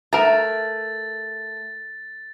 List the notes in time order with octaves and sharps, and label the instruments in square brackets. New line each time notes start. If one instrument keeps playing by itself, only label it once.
[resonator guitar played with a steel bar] A3 [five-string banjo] A#4 A#5 [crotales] A6